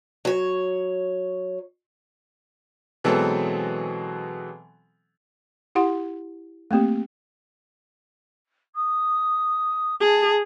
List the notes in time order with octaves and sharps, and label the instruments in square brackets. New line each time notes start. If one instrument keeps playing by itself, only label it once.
[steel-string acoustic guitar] F#3 C#5
[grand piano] B2 E3 F#3 G#3 C4 A4
[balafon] E4 G4 F#5 C6
A3 A#3 C4 G4
[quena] D#6
[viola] G#4 [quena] A5